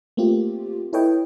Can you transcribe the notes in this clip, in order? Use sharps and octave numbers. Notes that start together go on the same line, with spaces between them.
A3 A#3 C4 F4 G4
E4 A4 B4 C#5 D#5 G5